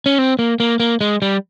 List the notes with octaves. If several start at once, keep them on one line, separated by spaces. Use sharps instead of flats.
C#4
C4
A#3
A#3
A#3
G#3
G3